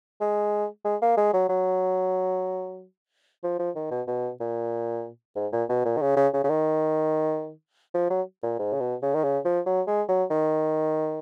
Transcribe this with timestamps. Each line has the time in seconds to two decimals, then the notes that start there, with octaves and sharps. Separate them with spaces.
0.21 G#3
0.85 G#3
1.02 A#3
1.17 G#3
1.33 F#3
1.49 F#3
3.44 F3
3.59 F3
3.76 D#3
3.91 B2
4.07 B2
4.40 A#2
5.36 G#2
5.52 A#2
5.69 B2
5.85 A#2
5.97 D#3
6.02 C#3
6.17 C#3
6.34 C#3
6.44 C#3
6.50 D#3
7.94 F3
8.10 F#3
8.43 A#2
8.59 G#2
8.73 C#3
8.80 B2
9.02 C#3
9.14 D#3
9.24 C#3
9.45 F3
9.66 F#3
9.87 G#3
10.09 F#3
10.31 D#3